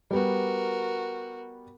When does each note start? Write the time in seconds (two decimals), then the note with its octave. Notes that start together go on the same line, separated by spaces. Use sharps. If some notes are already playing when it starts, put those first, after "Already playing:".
0.11 G3 B3 F#4 A#4